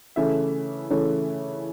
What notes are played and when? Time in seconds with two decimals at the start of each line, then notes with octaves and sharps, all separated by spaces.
0.16 C#3 E3 A3 C#4 E5
0.90 C#3 E3 A3 C#4